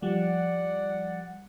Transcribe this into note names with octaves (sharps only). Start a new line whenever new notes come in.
F3 G3 D5 F#5